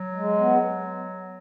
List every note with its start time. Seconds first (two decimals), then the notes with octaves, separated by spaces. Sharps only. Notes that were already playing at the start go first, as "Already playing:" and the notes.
Already playing: F#3
0.15 G#3
0.39 B3